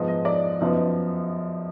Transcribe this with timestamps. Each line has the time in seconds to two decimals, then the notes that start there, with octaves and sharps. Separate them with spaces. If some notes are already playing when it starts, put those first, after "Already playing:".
Already playing: G#2 F3 B3 D#4
0.08 D#5
0.25 D5
0.60 F#2 F3 B3 D#4